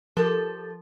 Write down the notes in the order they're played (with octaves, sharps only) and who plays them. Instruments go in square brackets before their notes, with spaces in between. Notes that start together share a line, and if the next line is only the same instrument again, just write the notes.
[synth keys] F3 [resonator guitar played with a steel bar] G4 A4 [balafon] A#4